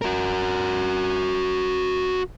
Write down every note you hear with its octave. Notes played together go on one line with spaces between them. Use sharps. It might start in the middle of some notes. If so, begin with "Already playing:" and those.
F#4 A#4